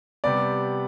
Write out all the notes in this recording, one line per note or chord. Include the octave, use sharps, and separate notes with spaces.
C3 G3 B3 D5